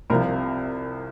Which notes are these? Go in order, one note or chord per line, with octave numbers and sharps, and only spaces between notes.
C2 C3 F3 A#4